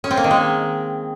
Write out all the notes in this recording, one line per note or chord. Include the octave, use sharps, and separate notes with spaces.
C#4
C4
A#3
D#3
G#3